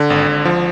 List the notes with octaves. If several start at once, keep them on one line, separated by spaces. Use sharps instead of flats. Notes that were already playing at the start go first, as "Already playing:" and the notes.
Already playing: D3
G#1
G#1
F3